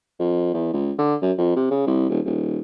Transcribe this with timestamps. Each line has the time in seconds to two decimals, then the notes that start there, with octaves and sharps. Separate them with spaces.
0.19 F2
0.53 E2
0.73 C#2
0.99 D3
1.22 F#2
1.38 F2
1.56 C3
1.71 C#3
1.87 C2
2.09 D#1
2.25 D#1